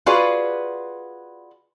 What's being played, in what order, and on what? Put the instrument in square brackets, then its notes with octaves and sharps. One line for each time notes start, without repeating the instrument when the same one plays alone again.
[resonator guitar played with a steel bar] F4 F#4 G#4 B4 D5 F5